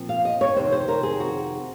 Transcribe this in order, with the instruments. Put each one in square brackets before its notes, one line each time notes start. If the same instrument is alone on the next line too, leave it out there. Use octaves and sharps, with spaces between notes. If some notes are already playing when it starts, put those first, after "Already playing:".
Already playing: [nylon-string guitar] A#2 F3 C4
F5
D#5
C#5
F2 C3 D#3 C5
C5
A#4
G#4
F#4